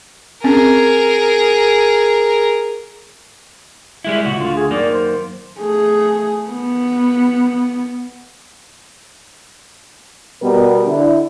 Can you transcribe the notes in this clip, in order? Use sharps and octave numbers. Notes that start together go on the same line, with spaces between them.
C4 C#4 G#4 A#4
G3 G#3 E4
C#2 A#2 F#4
D2 D3 F4
G#4
F#2 D#3 A#3 D5
C5
A3 G#4
B3
B2 G3 B3 A#4
D3 D4 E4